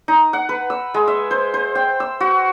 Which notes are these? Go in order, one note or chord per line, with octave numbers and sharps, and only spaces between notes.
D#4
F#5
B4
E6
G#3
E5
C5
C5
G5
E6
F#4